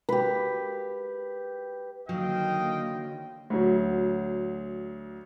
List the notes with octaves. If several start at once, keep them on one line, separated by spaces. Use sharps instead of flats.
G4 B4
D3 D#3 F#3 A#3 D#5 F5 G5
D2 F#3